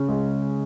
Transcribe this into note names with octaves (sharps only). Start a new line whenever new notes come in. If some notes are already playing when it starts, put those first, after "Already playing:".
Already playing: C#3 C#4
G#3